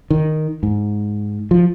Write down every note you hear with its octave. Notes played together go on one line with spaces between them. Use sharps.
D#3
G#2
F3